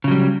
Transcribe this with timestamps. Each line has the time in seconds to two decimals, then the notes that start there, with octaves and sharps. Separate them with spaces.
0.04 C#3
0.08 F#3
0.11 G3